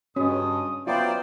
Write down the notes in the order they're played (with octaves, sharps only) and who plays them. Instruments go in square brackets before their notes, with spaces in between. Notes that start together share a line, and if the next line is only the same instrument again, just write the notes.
[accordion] G2 [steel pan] C#4 [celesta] F#4 G#4 D#5 [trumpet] D#6
[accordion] F#3 B3 D5 [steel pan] F4 [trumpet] C5 [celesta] E5 G5 A#5